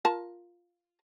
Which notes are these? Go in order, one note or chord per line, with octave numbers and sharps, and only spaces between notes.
F4 A#4 A5